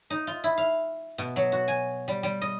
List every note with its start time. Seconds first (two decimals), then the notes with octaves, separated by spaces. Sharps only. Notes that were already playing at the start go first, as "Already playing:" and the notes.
0.10 D#4
0.27 F4
0.44 E4
0.58 F5
1.18 B2
1.36 F#3
1.52 F#4
1.68 G#5
2.08 G3
2.23 G3
2.41 D#5